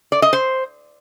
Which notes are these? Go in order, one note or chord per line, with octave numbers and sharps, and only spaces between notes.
D5
D#5
C5